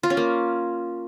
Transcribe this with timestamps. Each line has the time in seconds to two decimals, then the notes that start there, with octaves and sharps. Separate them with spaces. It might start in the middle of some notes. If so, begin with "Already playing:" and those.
0.03 F4
0.10 C#4
0.17 A#3